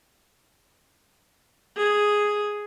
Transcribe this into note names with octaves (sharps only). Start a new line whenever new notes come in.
G#4